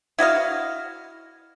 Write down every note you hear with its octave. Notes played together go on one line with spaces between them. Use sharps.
E4 F#4 D#5 F5